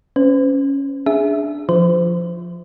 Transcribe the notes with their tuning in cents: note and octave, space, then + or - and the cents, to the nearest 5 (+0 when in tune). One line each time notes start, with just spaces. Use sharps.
C#4 +0 C5 -45
D4 +0 G#4 +0 E5 +0
F3 +0 C5 -25